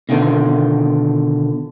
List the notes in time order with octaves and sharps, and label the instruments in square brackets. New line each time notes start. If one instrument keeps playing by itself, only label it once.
[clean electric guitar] B2 D3 D#3 F4